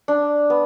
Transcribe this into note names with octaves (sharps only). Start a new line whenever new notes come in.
D4
B3